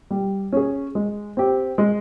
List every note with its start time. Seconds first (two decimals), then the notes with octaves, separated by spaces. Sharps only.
0.11 G3
0.53 C#4 G#4
0.95 G#3
1.37 C4 G4
1.78 G#3